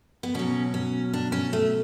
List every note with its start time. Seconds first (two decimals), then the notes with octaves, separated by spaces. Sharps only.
0.23 B3
0.34 B2 F#3 C#4
0.74 C#4
1.13 D4
1.32 C#4
1.53 A3